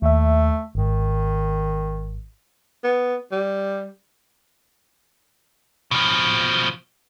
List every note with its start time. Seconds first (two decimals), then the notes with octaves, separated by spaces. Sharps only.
0.02 D#2 A3 E5
0.75 G#1 G#2 D#3
2.84 B3
3.32 G3
5.91 B2 F3